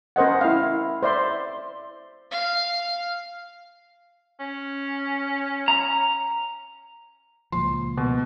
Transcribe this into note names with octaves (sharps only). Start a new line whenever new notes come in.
C#4 A#4 C5 D#5 F#5
E4 F5
C5 D5 E5 C6
F5
C#4
A#5
C#2 A#2 F3 C6
B2